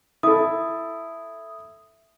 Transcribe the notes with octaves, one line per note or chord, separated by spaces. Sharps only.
E4 A4 D#6